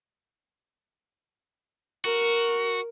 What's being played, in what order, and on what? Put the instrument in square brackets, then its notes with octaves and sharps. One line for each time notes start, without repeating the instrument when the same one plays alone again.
[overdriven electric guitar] F#4 [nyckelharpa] A#4